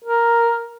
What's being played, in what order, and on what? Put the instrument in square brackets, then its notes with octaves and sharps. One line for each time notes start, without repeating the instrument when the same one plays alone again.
[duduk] A#4